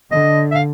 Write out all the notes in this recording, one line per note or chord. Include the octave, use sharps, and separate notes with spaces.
D3 D#5
E5
F5